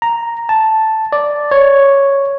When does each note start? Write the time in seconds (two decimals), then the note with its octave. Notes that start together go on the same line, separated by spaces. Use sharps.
0.02 A#5
0.49 A5
1.13 D5
1.51 C#5